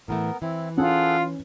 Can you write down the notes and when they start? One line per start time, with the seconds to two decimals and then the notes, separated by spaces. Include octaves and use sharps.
0.08 A2 E3 A3 B3 A#4
0.42 E3 C4 E4
0.77 C#4 F4 G#4 A4 F#5